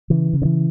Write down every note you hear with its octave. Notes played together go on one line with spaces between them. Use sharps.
C#3 E3
C#3
D3
E3